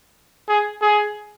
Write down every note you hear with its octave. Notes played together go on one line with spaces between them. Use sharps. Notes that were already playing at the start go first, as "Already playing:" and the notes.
G#4
G#4